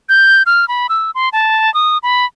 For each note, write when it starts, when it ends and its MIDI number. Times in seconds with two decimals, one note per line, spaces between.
0.09 0.43 91
0.46 0.68 89
0.68 0.87 83
0.89 1.11 88
1.15 1.29 84
1.33 1.73 81
1.74 1.98 87
2.03 2.25 83